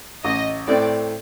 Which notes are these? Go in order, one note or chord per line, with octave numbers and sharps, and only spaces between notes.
A1 D#5
A2 A3 C4 D5